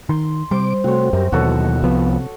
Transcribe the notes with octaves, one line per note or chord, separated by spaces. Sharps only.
D#3 C6
C3 G3 C5 D6
C3 A3 C4 F#4 C#5
F#2 G4 A#4
D#2 B2 E3 F#3 F#4 A4 C#5
C2 C3 F3 B3